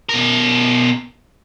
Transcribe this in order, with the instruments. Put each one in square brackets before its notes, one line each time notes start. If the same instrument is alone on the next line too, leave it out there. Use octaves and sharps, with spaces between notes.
[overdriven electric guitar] B2 A#4